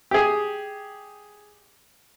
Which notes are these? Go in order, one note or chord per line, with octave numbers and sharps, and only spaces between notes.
G4 G#4